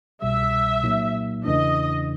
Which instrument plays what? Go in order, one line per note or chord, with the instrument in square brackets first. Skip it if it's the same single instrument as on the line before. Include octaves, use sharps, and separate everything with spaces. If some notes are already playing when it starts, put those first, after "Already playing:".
[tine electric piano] C2 B2 G3 [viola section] E5
[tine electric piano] A#2 F#3 A#3 D#4
[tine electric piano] E2 C#3 E3 A3 D4 [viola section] D#5